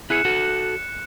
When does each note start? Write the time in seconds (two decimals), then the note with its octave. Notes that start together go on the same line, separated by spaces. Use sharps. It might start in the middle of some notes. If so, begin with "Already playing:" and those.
0.10 E4 G#4 F#6 C#7 E7
0.25 F#4 A4